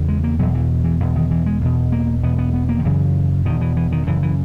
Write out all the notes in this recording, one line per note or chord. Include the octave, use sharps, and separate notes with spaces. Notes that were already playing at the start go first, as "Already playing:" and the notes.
Already playing: E2 C#3
G#3
A#3
E2 B2 F#3
E3
E3
E2 B2
D#3
E3
G#3
E2 B2
A#3
E2 B2 B3
B3
B3
A#3
D#3
F#2 C#3 E3
E2 B2 D#3
E3
E3
D#3
F#2 C#3 E3
E3